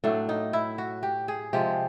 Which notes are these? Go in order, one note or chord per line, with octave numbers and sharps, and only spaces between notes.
A2 F#3 A3 D4
D#4
E4
F#4
G4
G#4
C3 F3 G#3 G4